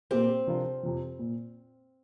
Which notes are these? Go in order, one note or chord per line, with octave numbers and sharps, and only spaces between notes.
A#2 A#3 C4 G4 C5
C3 F3 D4 F4 A#4
F2 C3 F3
A#2